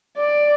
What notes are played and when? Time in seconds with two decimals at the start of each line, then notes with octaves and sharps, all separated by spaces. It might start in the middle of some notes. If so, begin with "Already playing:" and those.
0.18 D5